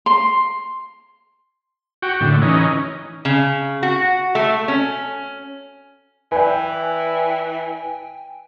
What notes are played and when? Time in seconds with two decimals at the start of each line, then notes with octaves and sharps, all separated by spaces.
0.06 C6
2.02 F#4 G5
2.21 A2 D3
2.42 E3 C#4 D#4
3.25 C#3
3.83 F#4
4.35 A3
4.68 C#4
6.32 E3 B4 D5 G5 G#5